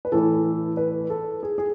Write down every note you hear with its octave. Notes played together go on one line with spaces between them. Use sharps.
B4
A2 E3 A4
B4
A4
G#4
G#4